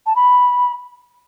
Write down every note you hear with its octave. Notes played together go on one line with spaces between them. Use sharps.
A5
B5